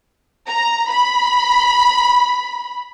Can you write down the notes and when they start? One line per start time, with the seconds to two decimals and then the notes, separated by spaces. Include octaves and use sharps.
0.49 A#5
0.89 B5